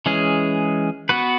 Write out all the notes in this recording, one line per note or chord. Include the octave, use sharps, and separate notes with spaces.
E3 G#3 C#4 G#4
B3 F#4 B4